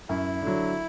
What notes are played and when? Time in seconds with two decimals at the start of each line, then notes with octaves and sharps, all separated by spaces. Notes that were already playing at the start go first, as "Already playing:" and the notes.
0.09 F#2 E4
0.42 D3 F#3